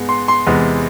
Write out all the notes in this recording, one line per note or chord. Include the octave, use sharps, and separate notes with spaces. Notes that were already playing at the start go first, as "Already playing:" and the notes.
Already playing: G#2 G#3 B3
C6
C6
E2 C3 G#3 B3